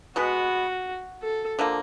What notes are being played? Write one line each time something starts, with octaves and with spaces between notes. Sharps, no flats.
B2 G#3 B3 F#4
A4
D3 F3 A#3